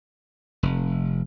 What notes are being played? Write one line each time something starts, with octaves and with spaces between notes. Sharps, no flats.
F1